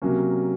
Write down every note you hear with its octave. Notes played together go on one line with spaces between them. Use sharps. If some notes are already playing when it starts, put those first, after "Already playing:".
C3 F#3 A#3 C#4